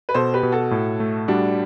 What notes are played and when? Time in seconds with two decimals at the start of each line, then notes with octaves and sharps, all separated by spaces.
0.09 B4
0.14 B2 A4 C5
0.33 G4 B4
0.43 B2
0.52 F#4 A4
0.71 A2
1.00 A3
1.28 G3 D4 F#4